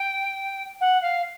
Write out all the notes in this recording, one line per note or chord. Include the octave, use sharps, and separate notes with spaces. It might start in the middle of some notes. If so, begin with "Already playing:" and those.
Already playing: G5
F#5
F5